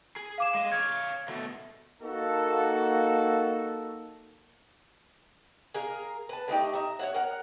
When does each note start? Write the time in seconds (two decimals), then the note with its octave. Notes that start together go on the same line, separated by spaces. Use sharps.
0.16 G#4
0.38 F5 D6 E7
0.54 G#3 D#5
0.72 C#5 F5 G#6
1.28 B2 A3
2.02 A#3 D#4 F#4 A4
5.74 G#4 A#4 F5
6.29 B4 A5
6.48 D3 A3 D#4 G4
6.74 E5 A#5
6.99 C#5 E5 F#5
7.15 A#4 F#5